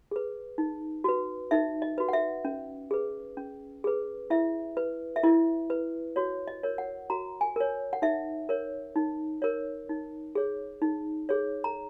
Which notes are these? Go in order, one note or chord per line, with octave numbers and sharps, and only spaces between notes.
G#4 B4
D#4
F#4 B4
D#4 E5
D#5
F#4 B4
F#5
E5
C#4
G#4 B4
C#4
G#4 B4
E4 E5
B4
E5
E4 D#5
B4
F#4 C#5
D#5
A#4 C#5
F#5
F#4 A#5
G#5
A#4 C#5
F#5
D#4 E5
A#4 C#5
D#4
A#4 C#5
D#4
G#4 C#5
D#4
G#4 C#5
A#5